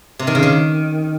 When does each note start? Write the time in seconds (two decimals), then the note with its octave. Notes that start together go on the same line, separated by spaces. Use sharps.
0.19 C3
0.27 D#3
0.35 C#3
0.43 D#3